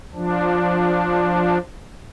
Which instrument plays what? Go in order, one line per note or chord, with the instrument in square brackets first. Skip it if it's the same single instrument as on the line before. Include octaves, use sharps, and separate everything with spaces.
[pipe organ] F3 D4